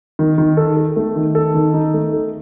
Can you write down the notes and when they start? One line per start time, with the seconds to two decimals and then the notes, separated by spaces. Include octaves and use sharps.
0.19 D#3
0.38 D#3
0.57 A4
0.77 A4
0.96 A3
1.16 D#3
1.35 A4
1.54 D#3
1.74 D#4
1.94 A3
2.13 A4